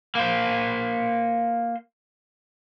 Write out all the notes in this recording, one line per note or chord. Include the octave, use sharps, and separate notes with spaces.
A#3 C5